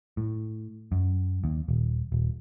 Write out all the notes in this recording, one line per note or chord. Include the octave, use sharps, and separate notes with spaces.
A2
F#2
D#2
D#1
D#1